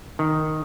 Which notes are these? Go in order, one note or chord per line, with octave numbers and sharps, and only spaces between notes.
D#3